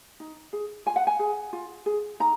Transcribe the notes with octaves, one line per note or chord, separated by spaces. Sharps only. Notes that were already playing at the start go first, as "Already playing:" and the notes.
D#4
G#4
F4 G#5
F#5
G#5
G#4
F4
G#4
D#4 A#5